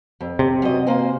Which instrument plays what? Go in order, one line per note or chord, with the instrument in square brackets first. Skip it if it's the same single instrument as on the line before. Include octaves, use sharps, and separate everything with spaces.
[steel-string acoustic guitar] F2
[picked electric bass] C3
[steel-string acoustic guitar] F#2 D#5
A#3 C5 G#5